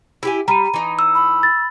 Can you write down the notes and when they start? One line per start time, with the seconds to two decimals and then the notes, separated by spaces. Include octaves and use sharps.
0.23 E4 G4 G#5
0.48 G3 A#5 B5 D#7
0.74 E3 D#4
0.99 E6
1.15 B5
1.43 A6